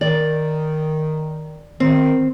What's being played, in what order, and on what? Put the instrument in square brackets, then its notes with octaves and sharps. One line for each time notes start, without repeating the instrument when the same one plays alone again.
[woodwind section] D#3 [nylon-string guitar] D5
[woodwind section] D#3 [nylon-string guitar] C4